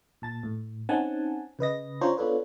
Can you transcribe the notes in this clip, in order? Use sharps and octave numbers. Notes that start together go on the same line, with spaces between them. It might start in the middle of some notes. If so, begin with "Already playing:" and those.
A#2 A5 A6
A2
C4 C#4 D#4 F#5 G#5 A5
C#3 B4 D#5 A#6
C#4 D4 F4 C5 C#5 A#5
B3 D4 F4 A4 B4 C#5